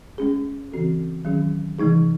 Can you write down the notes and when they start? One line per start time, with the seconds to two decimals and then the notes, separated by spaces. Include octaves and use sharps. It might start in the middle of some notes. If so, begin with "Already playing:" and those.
0.18 G#3 C#4 G#4
0.72 C#3 E3 C4 F#4 A4
1.25 D#3 F#3 C#4 G#4
1.79 C3 E3 G#3 D#4 G#4